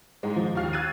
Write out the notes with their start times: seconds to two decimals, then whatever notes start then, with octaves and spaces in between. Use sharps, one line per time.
0.23 G#2 G#3
0.36 F3
0.55 D#2 F4 F6 C7
0.73 E6 F#6 G#6 A6 D#7